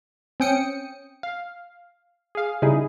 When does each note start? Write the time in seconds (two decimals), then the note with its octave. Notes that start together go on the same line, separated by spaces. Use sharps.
0.40 C4 C#4 G5 D#6 C#7
1.23 F5
2.35 G#4 F5
2.62 C#3 G3 D#4 E4 G#4